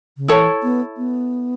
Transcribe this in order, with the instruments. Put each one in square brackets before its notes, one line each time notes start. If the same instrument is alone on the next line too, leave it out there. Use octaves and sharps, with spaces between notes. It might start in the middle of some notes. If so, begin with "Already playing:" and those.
[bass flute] C#3
[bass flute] E3 [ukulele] E4 A4 C#5
[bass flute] B3
B3